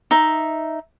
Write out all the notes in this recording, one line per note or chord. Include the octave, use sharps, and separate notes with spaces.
D#4 E5